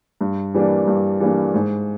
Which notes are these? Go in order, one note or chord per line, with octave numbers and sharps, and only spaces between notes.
G2
E3 G3 A#3 D4
G2
E3 G3 A#3 D4
G#2